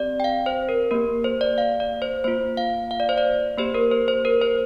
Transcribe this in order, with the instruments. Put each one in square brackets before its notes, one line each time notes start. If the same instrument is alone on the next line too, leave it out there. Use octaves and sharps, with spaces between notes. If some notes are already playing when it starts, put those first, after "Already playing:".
Already playing: [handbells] C4 G4 D5
G5
F5
C5
A#4
A#3 G4 A#4
C5
D5
F5
D5
C5
A#3 F4 C5
F5
F5
D5
C5
D5
A#3 G4 C5
A#4
C5
C5
A#4
C5